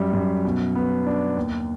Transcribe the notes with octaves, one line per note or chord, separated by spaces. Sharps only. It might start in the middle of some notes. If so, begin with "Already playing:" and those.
Already playing: F#2 G3
F#2
B2
B3
D4
D#2